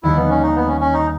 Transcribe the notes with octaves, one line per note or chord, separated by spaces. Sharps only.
D#2 D#3 G3 E4
B3
C#4
D#4
B3
C#4
C#4
D#4